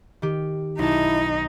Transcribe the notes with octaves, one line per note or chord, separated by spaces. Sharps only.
D#3 G4
B1 D#4 E4 A5